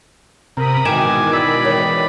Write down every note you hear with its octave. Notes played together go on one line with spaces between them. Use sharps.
C3 A#4 A#5 B5 D#6
G#2 B2 D#3 E3 G#5 D6 E7
D5 B5 E6 G#6
D#3 A#4 C#5